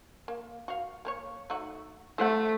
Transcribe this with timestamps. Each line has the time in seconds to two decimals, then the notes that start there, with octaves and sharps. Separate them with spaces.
0.28 A#3
0.68 F#4 F5
1.05 A#3 A#4 C#5
1.50 A3 D#4 F#4
2.18 A3 A4 C5 F#5